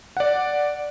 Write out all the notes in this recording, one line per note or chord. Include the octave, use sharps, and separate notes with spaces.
D5 F#5